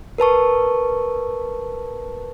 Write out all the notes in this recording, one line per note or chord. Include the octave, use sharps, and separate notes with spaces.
A#4 B4 A5 C#6